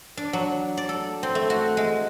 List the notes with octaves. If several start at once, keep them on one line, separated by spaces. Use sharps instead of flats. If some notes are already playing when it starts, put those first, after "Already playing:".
D4
F#3
D5
A4
C4
A3
F#4
G#3